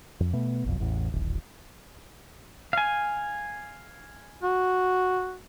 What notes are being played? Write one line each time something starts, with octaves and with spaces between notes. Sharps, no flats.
F2
B2 A3 B3
F#1 B1 F2
A1 E2
D1 G#1
F5 G#5
F#4